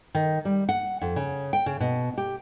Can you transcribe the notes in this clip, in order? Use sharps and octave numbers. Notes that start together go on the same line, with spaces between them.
D#3
G3
F#5
F2
C#3
G5
C#3
B2
G4